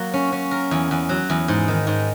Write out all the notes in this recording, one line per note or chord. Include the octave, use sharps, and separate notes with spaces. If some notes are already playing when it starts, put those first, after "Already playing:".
Already playing: F#3 A#3
C#4
C#4
A#4
E2
E2
F#3
E2
G#2
D#3
G#2